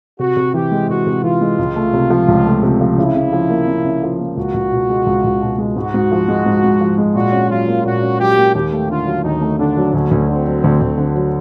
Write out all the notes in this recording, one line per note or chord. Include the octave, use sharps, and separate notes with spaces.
C3 F#4
C3
E3 G4
G#3
C3 F#4
C3
E3 F4
G#3
C#2
A3
C3
F3
C#2
A3
C3
F3
C#3 E4
C#3
F3
A#3
C#3
C#3
F3
A#3
C#2 F#4
C#2
B2
G#3
C#2
C#2
B2
G#3
G#2 F#4
G#2
F3
G#3
G#2
G#2
F3
G#3
A#2 F#4
C#4
F#3 F4
A#3
A#2 F#4
C#4
F#3 G4
A#3
D#2 G4
A3
D3 F4
F#3
D#2 D#4
A3
D3 D4
F#3
D2 C#4
D2
D3 C4
F#3
D2
D2
D3
F#3